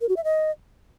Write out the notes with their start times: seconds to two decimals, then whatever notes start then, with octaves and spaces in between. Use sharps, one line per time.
0.01 A#4
0.09 F#4
0.17 E5
0.24 D#5